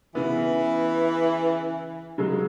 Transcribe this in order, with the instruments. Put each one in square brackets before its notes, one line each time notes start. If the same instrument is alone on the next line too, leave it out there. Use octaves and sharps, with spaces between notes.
[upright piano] C#3 B3 [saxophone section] E3
[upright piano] C#3 F#3 G#3